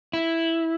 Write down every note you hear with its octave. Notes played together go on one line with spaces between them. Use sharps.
E4